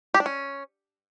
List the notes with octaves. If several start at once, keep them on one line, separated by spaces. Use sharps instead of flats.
G4
D4
C#4